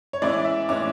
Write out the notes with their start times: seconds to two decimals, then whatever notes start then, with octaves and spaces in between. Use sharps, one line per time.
0.13 C#5
0.22 E3 G#3 C#4 E4 D5
0.45 E5
0.69 E3 G#3 C#4 E4 D6